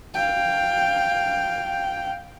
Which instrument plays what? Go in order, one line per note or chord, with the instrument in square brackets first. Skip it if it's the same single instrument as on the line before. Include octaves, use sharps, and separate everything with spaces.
[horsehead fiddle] F5 G5